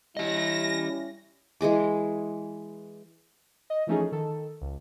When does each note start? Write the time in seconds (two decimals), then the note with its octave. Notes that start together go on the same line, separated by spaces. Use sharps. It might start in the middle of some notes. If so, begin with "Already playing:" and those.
0.17 G3 C#4 E4 G4 D#5 A#6
1.61 E3 G#3 G#4 D6
3.70 D#5
3.87 E3 F3 A3 C#4 D#4 G#4
4.12 D#3 A4
4.61 C#2